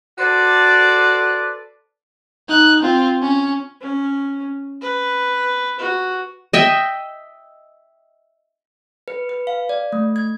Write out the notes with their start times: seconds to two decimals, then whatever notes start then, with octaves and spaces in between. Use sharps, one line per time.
0.19 F#4 A4 B4 C5 D5
2.49 D#4 F#6
2.82 C4 F4
3.22 C#4
3.81 C#4
4.81 B4
5.79 F#4
6.53 D#5 E5 G5
9.08 B4
9.29 B4
9.47 F5
9.69 D5
9.92 A3
10.16 G#6